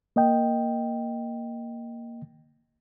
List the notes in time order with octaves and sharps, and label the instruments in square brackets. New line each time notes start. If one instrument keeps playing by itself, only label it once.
[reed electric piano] A#3 D#5 G5